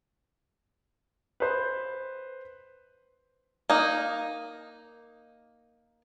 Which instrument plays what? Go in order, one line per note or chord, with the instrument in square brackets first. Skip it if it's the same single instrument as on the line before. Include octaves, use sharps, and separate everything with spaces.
[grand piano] B4 C5
[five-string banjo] A#3 D#4